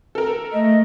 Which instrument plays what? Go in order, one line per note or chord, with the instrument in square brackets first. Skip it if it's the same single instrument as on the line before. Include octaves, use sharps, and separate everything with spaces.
[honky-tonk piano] A4 A#4
[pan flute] A3 [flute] D#5